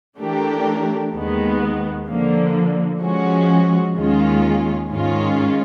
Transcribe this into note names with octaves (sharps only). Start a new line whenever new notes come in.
E3 A3 D4 G4 A#4
D#2 D#3 G#3 B3
D3 F3 A#3
F3 G#3 C#4 F#4
D#2 D#3 G#3 C#4 F4
G#2 D#3 G#3 C#4 F4